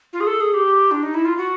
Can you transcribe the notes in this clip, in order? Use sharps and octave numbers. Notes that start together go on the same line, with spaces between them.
F4
G#4
A4
G#4
G4
D4
D#4
E4
F4
F#4